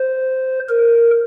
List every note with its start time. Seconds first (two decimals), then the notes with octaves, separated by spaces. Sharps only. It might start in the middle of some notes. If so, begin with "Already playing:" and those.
Already playing: C5
0.69 A#4